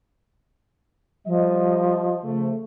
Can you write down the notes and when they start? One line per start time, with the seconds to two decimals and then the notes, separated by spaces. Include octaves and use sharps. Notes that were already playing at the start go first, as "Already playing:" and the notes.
1.26 F3 G3 D#5
2.23 C#3 F3 A3